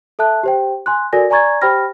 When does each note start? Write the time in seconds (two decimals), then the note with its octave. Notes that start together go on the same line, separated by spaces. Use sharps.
0.19 A4 E5 A5 F#6
0.43 G4 C5 G5
0.86 G#5 C6 F#6
1.13 F#4 A4 A#4 D5 G#5 A#6
1.30 D5 G#5 A#5 C#6 G#6 A6
1.62 G4 C5 G5 B5 F6 A#6